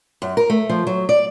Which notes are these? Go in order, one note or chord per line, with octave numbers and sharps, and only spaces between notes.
F#2
A#4
A3
F3
F#3
D5